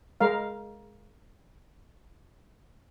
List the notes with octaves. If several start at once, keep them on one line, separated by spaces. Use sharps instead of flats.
G#3 A#4 F5